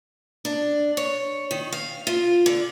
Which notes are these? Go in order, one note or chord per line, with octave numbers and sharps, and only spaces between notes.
D4
C#5
D#3
F5
F4
D3